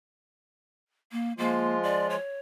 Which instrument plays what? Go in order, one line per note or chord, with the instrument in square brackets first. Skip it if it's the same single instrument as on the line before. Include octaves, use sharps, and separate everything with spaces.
[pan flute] A#3
[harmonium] F3 G#3 F4 [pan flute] A#3
[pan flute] D5
C#5